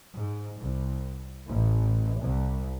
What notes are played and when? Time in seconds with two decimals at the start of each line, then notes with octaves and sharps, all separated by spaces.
0.16 G#2
0.60 C2
1.47 A1
2.21 C2